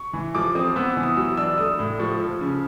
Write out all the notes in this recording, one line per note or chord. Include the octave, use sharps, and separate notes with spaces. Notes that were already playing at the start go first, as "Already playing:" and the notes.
Already playing: C#6
E3
F3 D6
C4 D#6
B3 E6
E3
D#6
F#3 E6
D4 E6
A3 D#6
A2
F3 C#6
F3
C#3